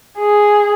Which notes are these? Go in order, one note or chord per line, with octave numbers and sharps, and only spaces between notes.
G#4